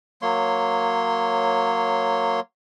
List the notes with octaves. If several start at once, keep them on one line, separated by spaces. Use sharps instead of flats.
F#3 A#3 C#5 C6